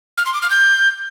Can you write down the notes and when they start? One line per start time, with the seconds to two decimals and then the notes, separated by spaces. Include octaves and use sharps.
0.18 F6
0.26 C6
0.34 D6
0.42 F6
0.50 G6